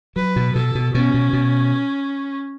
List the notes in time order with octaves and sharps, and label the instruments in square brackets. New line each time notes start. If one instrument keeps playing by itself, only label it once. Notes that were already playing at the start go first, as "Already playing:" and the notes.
[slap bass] F#3 [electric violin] B4
[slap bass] B2
[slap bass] B2 [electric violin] A4
[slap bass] B2
[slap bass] B2 [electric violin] C#4
[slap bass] B2
B2